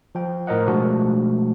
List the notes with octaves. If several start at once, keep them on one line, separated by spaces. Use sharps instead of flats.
F3 G5
A2 A#4 C5 D#5 F#5
B2 F3 G#3 A3 D4 F#4